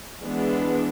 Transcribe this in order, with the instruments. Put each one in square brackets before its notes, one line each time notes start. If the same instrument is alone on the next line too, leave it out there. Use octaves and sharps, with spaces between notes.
[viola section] E3 G#3 B3 D4